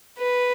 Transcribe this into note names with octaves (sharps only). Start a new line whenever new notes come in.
B4